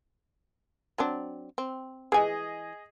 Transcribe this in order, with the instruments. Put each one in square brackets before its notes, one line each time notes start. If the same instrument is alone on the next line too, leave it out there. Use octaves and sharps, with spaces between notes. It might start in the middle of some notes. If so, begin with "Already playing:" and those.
[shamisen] F#3 C4 D4
C4
[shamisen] E3 G#5 [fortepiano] G#4 D#5